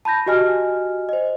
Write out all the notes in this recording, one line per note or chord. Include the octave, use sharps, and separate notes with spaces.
A5 B5 G6 A#6
F#4 G4 D#5 G#5 F6
C5 D#5